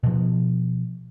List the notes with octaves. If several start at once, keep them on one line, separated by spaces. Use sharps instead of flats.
B2 F3